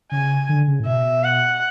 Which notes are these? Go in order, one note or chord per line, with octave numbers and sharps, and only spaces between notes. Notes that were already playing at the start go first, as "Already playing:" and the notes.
C#3 G#5
D3
C#3
A2
B2 E5
F#5